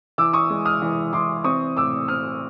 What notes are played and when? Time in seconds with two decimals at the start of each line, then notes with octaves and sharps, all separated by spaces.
0.18 E3 D6 E6
0.33 C#6 D#6
0.50 G#3
0.65 D#6 F6
0.82 E3
1.13 E3 C6 D6
1.44 C4 C#6 D#6
1.77 A2 D6 E6
2.08 C4 D#6 F6